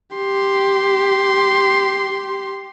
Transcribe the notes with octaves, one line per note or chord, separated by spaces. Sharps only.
G4 C6